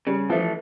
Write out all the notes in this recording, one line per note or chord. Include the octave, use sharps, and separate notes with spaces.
C#3 G3
E3 F3 A3